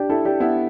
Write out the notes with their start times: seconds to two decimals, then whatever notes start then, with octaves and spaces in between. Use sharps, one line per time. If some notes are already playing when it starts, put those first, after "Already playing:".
Already playing: D4 G4
0.09 E4 A4
0.25 D4 G4
0.40 B3 E4